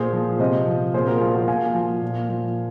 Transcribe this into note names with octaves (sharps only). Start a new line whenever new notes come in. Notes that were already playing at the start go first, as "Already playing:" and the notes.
Already playing: A#2 G#4 C5
F3
C3 C5 D#5
F3
A#2 G#4 C5
F#4 A#4
F3 F4 G#4
F#4 A#4
A#2 F5 G#5
F3
A#2
F3